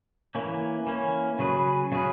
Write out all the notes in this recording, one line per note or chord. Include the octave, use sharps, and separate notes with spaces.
E3 A#3 C#4
E3 A#3 C#4
C#3 F#3 C#4 G#4 B4
C#3 F#3 C#4 G#4 B4